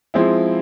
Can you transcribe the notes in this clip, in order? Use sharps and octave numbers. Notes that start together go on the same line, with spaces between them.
F3 G#3 C4 E4